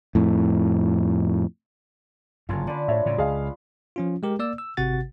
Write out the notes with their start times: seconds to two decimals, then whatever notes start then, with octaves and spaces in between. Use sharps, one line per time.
0.15 F2 A2
2.49 F#1 G2 D3 A#3 C#4 F4
2.67 D3 D4 B4
2.88 A2 C#5 E5
3.06 A2 C#3
3.18 C#2 G#4 D#5 F5
3.96 F3 C#4 F4
4.23 G#3 G4 A#4
4.39 A#3 D5 E6
4.58 E6
4.77 G#1 C3 F#4 F#5 A6